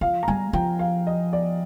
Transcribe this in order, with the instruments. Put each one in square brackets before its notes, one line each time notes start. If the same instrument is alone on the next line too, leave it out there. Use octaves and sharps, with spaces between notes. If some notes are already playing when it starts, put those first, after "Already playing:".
[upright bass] F3 [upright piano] F5
[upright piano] A#5
[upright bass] G3 [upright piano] G#5
[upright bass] F3 [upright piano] G5
[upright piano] F5
D#5
D5